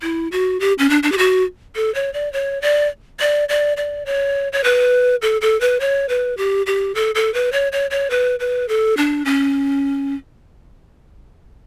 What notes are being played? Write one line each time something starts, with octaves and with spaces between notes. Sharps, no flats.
E4
F#4
G4
C#4
D4
D4
G4
F#4
A4
C#5
D5
C#5
D5
D5
D5
D5
C#5
C#5
B4
A4
A4
B4
C#5
B4
G4
G4
A4
A4
B4
C#5
C#5
C#5
B4
B4
A4
D4
C#4